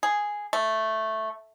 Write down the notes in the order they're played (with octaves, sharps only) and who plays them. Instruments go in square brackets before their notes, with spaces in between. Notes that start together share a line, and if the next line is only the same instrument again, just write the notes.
[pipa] G#4
A3